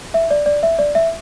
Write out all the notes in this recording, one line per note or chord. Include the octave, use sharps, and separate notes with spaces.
E5
D5
D5
E5
D5
E5